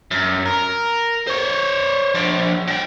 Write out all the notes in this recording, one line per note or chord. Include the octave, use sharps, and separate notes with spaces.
F#2
A#4
C5 C#5
F3 D4
F#3 G5